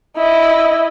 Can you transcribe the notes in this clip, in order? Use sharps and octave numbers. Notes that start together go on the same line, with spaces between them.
E4 D#5